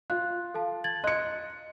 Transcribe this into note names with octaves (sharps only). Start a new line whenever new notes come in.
F4 F#6
A4 F5 A5
G#6 A6 F#7
D#5 C6 F#6 C#7